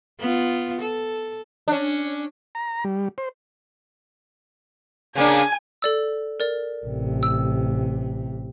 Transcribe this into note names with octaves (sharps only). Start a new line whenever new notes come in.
B3 F4
A4
C#4 D4
A#5
G3
C5
C#3 A#3 D4 G#5
A4 D5 E6
A#4 D5
A1 C3
E6